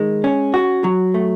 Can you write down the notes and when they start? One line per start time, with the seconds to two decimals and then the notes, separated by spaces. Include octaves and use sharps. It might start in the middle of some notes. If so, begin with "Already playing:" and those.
Already playing: D#3 G#3
0.24 C#4
0.54 F#4
0.84 F#3
1.14 A3